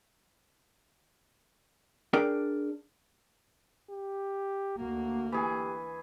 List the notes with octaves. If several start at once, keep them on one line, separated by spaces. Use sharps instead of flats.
D4 G#4 A#4 D5 G5
G4
D2 A#3 F#4
E3 G4 G#4